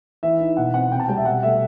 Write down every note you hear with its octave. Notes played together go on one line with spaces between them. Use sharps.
E3 E5
D#4
B2 F#5
C4 F#5
C3 G5
A5
G3 G5
E5
B2 F#5
A3 E5